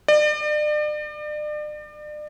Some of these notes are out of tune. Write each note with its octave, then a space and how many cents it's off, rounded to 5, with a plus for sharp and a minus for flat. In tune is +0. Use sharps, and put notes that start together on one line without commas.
D5 +35